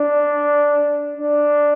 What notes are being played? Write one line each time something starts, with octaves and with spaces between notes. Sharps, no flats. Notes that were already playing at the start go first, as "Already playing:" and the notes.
Already playing: D4
D4